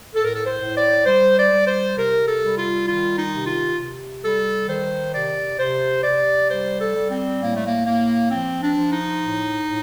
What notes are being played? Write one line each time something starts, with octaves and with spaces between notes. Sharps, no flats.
A2 A4
A#4
A4
C5
A2
D5
G3 C5
D5
G3
C5
C3 A#4
A4
G3
F4
D#3 F4
D#4
C3
F4
C3
G3 A4
D#3 C5
C3 D5
C3 C5
C3 D5
G3 C5
A4
G3
C4
A2 A#3
A3
A#3
A2 A#3
F3 C4
D4
F3
D#4
A2
A2